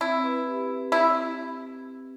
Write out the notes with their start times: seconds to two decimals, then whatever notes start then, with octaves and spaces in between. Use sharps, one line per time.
0.01 C4 E4
0.23 B4
0.47 G4
0.70 C4
0.92 C4 E4